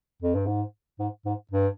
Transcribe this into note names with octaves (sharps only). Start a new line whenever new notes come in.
F2
G2
G#2
G#2
G#2
G2